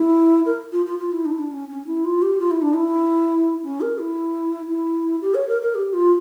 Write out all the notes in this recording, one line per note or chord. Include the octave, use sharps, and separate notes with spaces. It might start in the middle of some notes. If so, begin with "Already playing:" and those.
Already playing: E4
A#4
F4
F4
F4
E4
D4
E4
D4
C#4
C#4
E4
F4
G4
F4
E4
D4
E4
C#4
A#4
E4
E4
G4
C#5
A#4
A#4
G4
F4